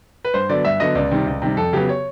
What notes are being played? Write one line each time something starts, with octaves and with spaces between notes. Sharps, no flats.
B4
G2 C5
D3 F#3 B3 D5
G2 E5
D3 F#3 B3 D#5
C#2 D5
C3 D#3 G3
C#2
C3 D#3 G3
F2 A4
C#3 F#3 B3 G4
C#5